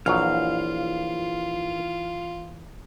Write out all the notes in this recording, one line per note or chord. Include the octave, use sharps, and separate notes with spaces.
A#1 E3 F#3 F4 F5